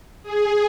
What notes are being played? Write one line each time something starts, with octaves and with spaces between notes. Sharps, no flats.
G#4